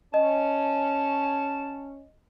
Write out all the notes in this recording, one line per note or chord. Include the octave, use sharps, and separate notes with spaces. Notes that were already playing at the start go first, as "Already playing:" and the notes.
C#4 D#5 A5